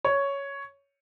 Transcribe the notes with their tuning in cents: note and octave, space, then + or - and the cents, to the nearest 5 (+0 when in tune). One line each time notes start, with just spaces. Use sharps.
C#5 +5